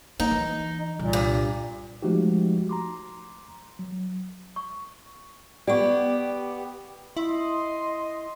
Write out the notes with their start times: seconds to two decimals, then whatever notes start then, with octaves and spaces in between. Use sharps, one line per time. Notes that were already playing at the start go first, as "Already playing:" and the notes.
0.20 A#3 D#4
0.31 E3
0.99 C2 A#2
1.13 G2
2.02 F3 G#3 A3 D#4 F#4 G4
2.69 A#5 C6 D6
3.79 F#3
4.56 C#6
5.67 B3 G4 D5 F#5 C#6
7.17 E4 D#5 C6